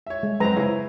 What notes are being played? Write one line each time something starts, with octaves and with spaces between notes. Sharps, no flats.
C#5 E5
G#3
F#2 G#3 C4 B4 A#5
C#3 C#4 E4